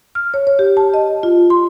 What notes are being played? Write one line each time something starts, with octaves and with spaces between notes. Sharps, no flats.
F6
C#5
C#5
G4
A5
D#5
F4
C6